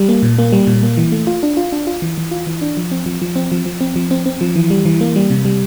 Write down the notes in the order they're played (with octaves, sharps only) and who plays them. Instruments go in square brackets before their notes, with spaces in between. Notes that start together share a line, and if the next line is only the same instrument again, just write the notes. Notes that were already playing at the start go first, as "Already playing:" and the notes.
Already playing: [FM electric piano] G3
A#3
A#2
A#3
G3
A#2
A#3
E3
A3
F4
D4
F4
D4
F4
E3
E3
F4
E3
D4
F3
C4
F3
F3
C4
F3
F3
C4
F3
C4
C4
F3
E3
G3
E3
A#3
G3
C3
G3